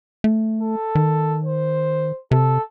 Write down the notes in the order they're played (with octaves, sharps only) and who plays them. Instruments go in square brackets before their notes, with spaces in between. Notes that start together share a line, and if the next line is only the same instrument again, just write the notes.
[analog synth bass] A3
[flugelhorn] A4
[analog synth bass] D#3
[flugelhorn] C5
[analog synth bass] C3 [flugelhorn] A4